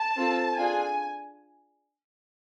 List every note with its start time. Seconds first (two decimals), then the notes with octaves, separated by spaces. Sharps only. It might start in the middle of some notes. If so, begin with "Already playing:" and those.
Already playing: A5
0.16 C4 F4 A4
0.57 D4 F4 G#4 G#5